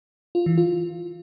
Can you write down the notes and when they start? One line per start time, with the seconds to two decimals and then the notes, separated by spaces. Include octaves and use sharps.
0.35 F4
0.46 E3
0.58 F4